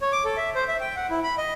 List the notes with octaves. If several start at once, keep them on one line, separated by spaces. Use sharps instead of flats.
C#5
D6
A4
E5
C5
E5
G5
F#5
E4
B5
D#5